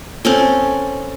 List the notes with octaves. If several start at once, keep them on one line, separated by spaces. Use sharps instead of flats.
C4 C#4 A4